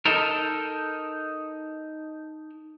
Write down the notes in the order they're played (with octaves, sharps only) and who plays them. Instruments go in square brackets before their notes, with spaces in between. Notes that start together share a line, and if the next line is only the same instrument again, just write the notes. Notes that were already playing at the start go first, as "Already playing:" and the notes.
[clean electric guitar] D#4 A4 A#4